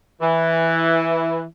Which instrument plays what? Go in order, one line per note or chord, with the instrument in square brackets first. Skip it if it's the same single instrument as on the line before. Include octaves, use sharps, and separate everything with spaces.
[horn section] E3